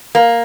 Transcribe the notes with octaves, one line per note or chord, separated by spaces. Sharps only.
A#3